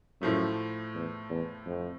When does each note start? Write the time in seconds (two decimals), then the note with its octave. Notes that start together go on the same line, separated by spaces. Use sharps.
0.21 F#2 A2 F3 A3
0.94 E2
1.30 E2
1.66 F2